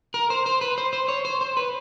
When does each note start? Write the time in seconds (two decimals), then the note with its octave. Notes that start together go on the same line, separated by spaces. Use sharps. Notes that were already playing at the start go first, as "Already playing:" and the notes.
0.14 A#4
0.30 C5
0.46 C5
0.61 B4
0.78 C5
0.93 C5
1.08 C#5
1.25 C5
1.41 C5
1.57 B4